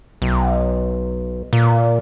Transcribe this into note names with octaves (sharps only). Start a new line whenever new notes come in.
B1
A#2